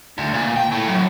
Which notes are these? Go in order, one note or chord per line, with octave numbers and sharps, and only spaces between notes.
D2
A#2
G5
A2
F#2